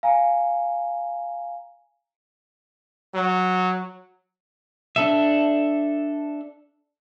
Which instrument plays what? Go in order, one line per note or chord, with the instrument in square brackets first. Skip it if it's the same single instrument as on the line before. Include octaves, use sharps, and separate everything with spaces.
[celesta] F5 G#5 A#5
[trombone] F#3
[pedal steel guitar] D4 A4 E5